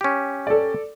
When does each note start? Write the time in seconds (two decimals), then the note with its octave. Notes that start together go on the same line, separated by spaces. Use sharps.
0.01 C#4 G4
0.47 A4 D5